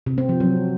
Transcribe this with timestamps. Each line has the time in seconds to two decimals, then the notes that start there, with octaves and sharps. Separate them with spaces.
0.06 C3
0.18 C4
0.29 F3
0.40 F#3